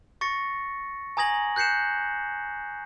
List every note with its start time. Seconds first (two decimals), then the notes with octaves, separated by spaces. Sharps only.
0.21 C#6 A6 A#6 C#7
1.17 G#5 A#5 D#6 G#6 A#6 F#7
1.56 F#6 G6 C7 C#7 E7